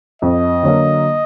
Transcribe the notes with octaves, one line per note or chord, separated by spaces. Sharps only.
F2 D#5
D3 F#3 A#3